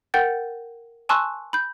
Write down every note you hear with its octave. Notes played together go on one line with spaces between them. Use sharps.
A#4 F#5 G5 G6 A6
G#5 A5 C6 C#6 E6 F#6
B5 G6